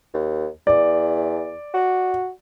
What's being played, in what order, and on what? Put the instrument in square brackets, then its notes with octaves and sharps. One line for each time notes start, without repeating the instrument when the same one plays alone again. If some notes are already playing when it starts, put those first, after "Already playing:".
[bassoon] D#2
[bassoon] E2 [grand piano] D5
[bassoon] F#4